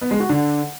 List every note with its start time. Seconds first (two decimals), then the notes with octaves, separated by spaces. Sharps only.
0.02 B3
0.11 G#3
0.20 F#4
0.29 D3